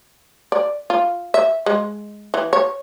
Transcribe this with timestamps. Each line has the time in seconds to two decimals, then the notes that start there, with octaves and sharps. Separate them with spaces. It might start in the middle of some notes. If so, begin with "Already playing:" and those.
0.52 D5
0.90 F4
1.34 E5
1.66 G#3
2.34 E3
2.53 C#5